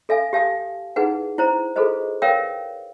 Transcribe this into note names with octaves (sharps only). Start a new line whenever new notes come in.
A4 E5 F5 G#5
G4 F5 A5 D#6
D#4 E4 G#4 B4 F#5
E4 C5 A#5
F4 G#4 A4 B4 C5 D#5
A#4 B4 C#5 F5 G5 D#6